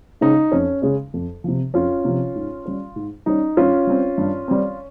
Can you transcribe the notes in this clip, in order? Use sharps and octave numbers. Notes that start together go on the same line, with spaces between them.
C#3 G#3 C#4 D#4
F2 C#4
C#3 G#3 C#4
F2
C3 F3
F2 C#4 F4
C3 F3
G#2
G3 C#4
G#2
G3 C#4 D#4
G2 C#4 F4
G3 C4
G2
G3 C4